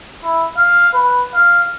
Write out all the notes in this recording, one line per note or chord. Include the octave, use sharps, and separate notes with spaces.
E4
F5
B4
F5